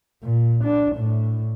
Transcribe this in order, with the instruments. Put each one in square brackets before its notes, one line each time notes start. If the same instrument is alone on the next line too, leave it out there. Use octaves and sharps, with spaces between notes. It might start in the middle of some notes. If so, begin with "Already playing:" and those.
[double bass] A#2
D4
A2